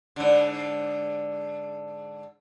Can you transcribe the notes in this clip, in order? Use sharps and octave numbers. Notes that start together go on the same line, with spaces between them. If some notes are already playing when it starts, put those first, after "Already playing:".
G#2 D3